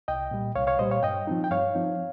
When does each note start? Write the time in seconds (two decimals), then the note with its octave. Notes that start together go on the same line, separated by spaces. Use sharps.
0.08 C2 D#5 G5
0.31 A#2 G3
0.55 C2 C#5 F5
0.67 C#5 F5
0.79 A#2 G3 C5 D#5
0.91 C#5 F5
1.03 G2 D#5 G5
1.27 F3 C4 D#4
1.44 G5
1.51 G2 C#5 F5
1.75 F3 C4 D#4